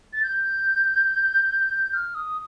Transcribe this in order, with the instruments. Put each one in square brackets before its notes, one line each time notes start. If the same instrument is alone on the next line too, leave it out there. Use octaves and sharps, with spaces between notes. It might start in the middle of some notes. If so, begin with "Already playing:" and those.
[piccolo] A6
G6
F6
D#6